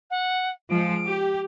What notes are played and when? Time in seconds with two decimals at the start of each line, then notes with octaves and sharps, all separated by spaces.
0.10 F#5
0.69 F3 G#3 D7
1.07 G4